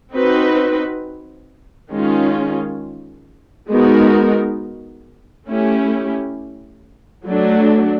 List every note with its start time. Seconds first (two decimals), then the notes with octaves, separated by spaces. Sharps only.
0.13 C4 D#4 F#4 B4
1.91 D#3 G#3 C#4 F4
3.69 G#3 B3 D#4 F#4 A#4
5.47 A3 C#4 E4 G4
7.25 F#3 A3 D4